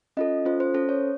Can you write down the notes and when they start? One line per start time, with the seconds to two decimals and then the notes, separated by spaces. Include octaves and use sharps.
0.17 C#4 F4 A4 D#5
0.45 C#4 F4 A4 C5
0.60 C5
0.74 C#4 A4 C5
0.89 C#5